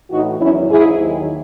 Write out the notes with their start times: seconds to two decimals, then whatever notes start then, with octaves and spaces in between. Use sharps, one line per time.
0.11 A2 E3 D#4 F#4
0.40 E2 D#3 F#3 C#4 E4
0.69 G#2 E3 E4 G#4
0.98 D#2 D#3 F#3